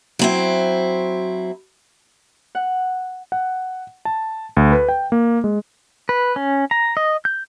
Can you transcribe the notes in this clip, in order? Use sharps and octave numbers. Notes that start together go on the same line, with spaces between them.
F#3 C4 E4
F#5
F#5
A5
D2
B4
G5
A#3
G#3
B4
C#4
A#5
D#5
G6